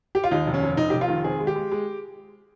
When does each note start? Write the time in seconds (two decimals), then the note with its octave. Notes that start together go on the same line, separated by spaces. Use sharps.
0.15 G4
0.24 F4
0.31 D#2 D#4
0.47 F1
0.54 C#4
0.63 F1
0.77 F1 D#4
0.90 F1 G4
1.01 F4
1.08 D#3
1.24 C4 G#4
1.40 G#3
1.47 G4
1.56 G#3
1.72 G#3